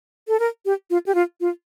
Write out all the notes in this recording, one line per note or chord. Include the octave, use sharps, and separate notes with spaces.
A4
A#4
G4
F4
G4
F4
F4